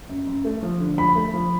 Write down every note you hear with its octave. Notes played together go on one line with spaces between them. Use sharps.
F#2
F#2
A3
F3
D3
F3 B5
A3
F3